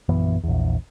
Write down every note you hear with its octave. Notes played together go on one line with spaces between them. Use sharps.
A#1 F#2 E3 B3
A#1 E2